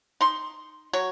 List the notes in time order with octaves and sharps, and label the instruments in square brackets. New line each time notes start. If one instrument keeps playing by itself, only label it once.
[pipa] D#4 C6
F#3 C#5